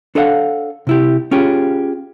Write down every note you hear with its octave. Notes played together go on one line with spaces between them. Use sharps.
D4 A4 C#5 D#5 F5 F#5
C3 E4 G4
C#4 F4 G4 G#4